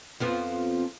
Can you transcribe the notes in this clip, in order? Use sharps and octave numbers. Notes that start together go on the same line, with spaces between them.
F2 F3 B3